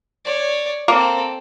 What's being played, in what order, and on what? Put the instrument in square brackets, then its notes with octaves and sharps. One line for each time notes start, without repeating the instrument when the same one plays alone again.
[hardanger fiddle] C#5 D5
[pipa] A#3 [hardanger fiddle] C4 A4